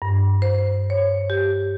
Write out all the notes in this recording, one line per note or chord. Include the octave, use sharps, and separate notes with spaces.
G2
C5
C#5
G4